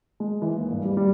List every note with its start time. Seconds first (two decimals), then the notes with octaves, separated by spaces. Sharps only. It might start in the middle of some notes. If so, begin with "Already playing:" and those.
0.20 G#3
0.42 E3
0.56 D#2
0.71 G2
0.85 G3
0.97 G3